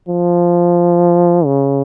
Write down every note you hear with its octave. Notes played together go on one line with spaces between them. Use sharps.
F3
C#3